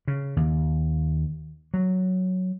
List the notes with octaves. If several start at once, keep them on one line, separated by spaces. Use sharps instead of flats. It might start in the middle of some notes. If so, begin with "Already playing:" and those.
C#3
D#2
F#3